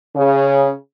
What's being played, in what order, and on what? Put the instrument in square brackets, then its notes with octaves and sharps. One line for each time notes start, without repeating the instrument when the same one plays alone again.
[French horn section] C#3